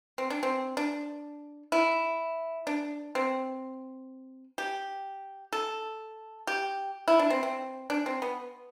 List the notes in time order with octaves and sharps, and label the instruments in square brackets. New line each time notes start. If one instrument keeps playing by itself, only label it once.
[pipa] C4
D4
C4
D4
E4
D4
C4
G4
A4
G4
E4
D4
C4
C4
D4
C4
B3